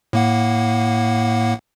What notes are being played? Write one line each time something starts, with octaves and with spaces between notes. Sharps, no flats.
A2 A#3 F#5